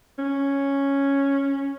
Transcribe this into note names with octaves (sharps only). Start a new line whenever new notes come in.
C#4